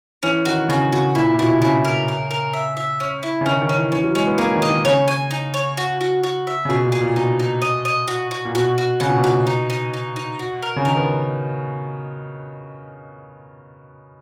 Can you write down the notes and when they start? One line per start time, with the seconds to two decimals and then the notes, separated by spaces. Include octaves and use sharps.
0.23 E3 C#4
0.45 D#3 F#4
0.69 C#3 F#4
0.92 C#3 F#4
1.15 A#2 E4
1.33 A#2
1.39 B2 E4
1.61 C#3 E4
1.84 A#4
2.08 A#4
2.31 A#4
2.53 E5
2.77 E5
3.00 C#4
3.23 E4
3.41 C#3
3.46 D#3 C#4
3.62 D#3
3.69 C#4
3.77 E3
3.92 E3 C#4
4.04 F#3
4.15 G#3 C#4
4.27 B3
4.38 A#3 G#4
4.54 D#3
4.62 D#5
4.69 D#3
4.85 C#3 C#5
5.08 G#5
5.31 D#4
5.54 C#5
5.77 F#4
6.01 F#4
6.23 F#4
6.47 E5
6.65 C#3
6.69 B2 G#4
6.85 A#2
6.92 G#4
7.01 A#2
7.16 B2 D#4
7.39 D#4
7.62 D#5
7.85 D#5
8.08 F#4
8.31 F#4
8.45 A#2
8.55 B2 F#4
8.78 F#4
9.00 C#3 F#5
9.09 B2
9.17 A#2
9.24 B2 F#4
9.47 D#4
9.70 D#4
9.94 D#4
10.16 D#4
10.39 F#4
10.62 A#4
10.76 C#3
10.85 D#3 A#4
10.97 B3